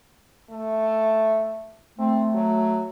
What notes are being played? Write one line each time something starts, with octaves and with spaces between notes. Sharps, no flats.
A3
A3 C4
F#3